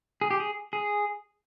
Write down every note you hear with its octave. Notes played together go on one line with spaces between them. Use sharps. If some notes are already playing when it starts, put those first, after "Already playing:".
G#4
G4
G#4
G#4